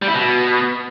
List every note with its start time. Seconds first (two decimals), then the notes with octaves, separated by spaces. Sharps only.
0.02 G3
0.08 E4
0.14 B2